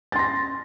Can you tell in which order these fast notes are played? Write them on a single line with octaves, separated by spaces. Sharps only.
A6 C6 A#6